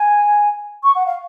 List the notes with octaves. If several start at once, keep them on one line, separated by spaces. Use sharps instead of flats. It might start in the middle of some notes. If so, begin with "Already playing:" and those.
Already playing: G#5
C#6
F#5
F5